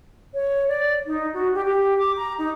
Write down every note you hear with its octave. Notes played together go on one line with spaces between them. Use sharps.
C#5
D5
D#4
F#4
G4
G4
D6
A#5
D#4